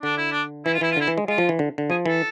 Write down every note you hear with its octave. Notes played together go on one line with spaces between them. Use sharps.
D3 D4
E4
D4
E3 E4
F4
E3 E4
F4
D3 E4
E3
G#3
G#3 F4
F3
E3
D3
D3
F3 G#4
E3 A4